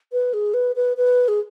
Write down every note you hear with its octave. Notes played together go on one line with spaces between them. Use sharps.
B4
G#4
B4
B4
B4
G#4